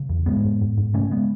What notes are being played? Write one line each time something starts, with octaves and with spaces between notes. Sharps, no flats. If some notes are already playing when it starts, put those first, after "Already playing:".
Already playing: C#3
E2
G#2 G#3 B3
G#2
G#2
G#2
C#3 A3 C#4
G#3 B3